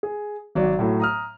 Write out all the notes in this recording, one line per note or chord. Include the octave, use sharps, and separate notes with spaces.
G#4
G#1 F#3 D5
A2 F#3 A3
A#5 D#6 F6